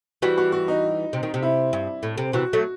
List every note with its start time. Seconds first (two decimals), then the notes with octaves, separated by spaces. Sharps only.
0.22 E3 G3 F#4
0.38 F#4
0.52 F#4
0.68 D#4
1.13 C3
1.23 D#3
1.34 C3
1.43 E4
1.73 G2
2.03 A2
2.18 C3
2.33 C3 E3 F#4
2.53 F#3 A3